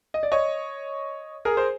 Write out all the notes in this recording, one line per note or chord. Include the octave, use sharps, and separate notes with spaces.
D#5
D5
C#5 D#5
G#4 A#4
C5